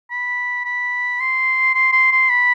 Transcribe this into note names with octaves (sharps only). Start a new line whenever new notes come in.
B5
B5
C6
C6
C6
C6
B5